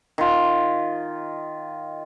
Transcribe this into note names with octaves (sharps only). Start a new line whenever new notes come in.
D#3 F4